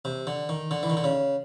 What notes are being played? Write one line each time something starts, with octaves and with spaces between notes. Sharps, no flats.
C3
D3
D#3
D3
E3
D#3
D3
C#3